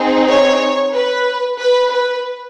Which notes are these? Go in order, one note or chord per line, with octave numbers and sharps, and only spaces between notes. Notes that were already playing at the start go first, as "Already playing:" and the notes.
Already playing: C4 D#4 G#4
C#5
B4
B4
B4